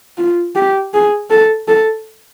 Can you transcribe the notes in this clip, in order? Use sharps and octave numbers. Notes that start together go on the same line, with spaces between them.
F4
G4
G#4
A4
A4